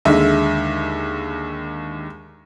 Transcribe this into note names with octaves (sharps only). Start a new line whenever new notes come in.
D#2 D3 G#3 E5